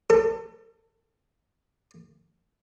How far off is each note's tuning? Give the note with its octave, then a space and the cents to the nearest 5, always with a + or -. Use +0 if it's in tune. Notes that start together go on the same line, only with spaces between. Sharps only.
A4 +35